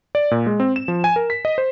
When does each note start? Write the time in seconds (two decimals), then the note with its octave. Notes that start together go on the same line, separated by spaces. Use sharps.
0.15 D5
0.31 A#2
0.46 G#3
0.60 C4
0.76 E7
0.88 F3
1.04 G#5
1.16 A#4
1.30 B6
1.45 D#5
1.58 C5